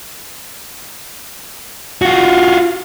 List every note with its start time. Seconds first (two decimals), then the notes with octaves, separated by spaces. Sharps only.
2.02 F4 F#4